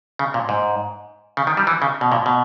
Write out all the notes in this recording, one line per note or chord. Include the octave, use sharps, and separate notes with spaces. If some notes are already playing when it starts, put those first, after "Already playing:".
C#3
A#2
G#2
C#3
D#3
G3
E3
C#3
B2
A#2
B2